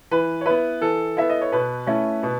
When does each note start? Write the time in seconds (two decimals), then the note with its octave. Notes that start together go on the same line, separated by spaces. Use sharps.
0.11 E3 B4
0.41 C#5
0.46 B3 E4 B4
0.81 E3 A4
1.17 B3 E4 E5
1.29 D#5
1.41 C#5
1.52 B2 B4
1.87 A3 C#4 E4
2.23 B2